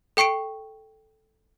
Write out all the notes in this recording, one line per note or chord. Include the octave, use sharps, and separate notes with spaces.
A4 G5 C#6 C7 D7